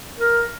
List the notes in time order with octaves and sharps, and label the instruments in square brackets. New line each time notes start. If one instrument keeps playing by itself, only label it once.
[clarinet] A#4